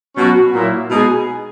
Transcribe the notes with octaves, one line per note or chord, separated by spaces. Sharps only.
B2 F#3 C#4 F#4
A#2 F#3 A#3 E4
B2 G#3 D#4 G#4